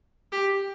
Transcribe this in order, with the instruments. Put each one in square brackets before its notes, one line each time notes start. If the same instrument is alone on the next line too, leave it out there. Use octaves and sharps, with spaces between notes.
[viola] G4